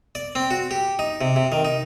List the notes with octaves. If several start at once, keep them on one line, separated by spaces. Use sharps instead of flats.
D5
C4
F#4
G4
D#4
C3
C3
D#3
D#4